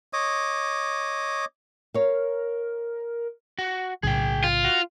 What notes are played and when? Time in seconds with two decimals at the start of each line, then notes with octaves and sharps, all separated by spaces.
0.13 C#5 D#5 D6 D#6
1.94 A#4 C#5 F5
3.59 F#4
4.03 B1 A2 C#3 G#4 G5
4.44 F4
4.64 F#4